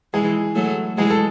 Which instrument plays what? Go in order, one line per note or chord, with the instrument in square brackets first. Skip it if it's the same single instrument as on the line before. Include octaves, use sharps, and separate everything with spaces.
[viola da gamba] E3 G#3 [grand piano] G#4
[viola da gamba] F#3 A3
[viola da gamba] E3 G#3 [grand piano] G#4
[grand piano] A4